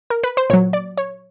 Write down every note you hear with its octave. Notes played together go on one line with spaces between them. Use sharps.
A#4
B4
C5
A#2 F#3 C#5
D5
C#5